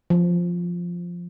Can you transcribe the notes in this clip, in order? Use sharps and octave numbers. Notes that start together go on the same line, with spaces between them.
F3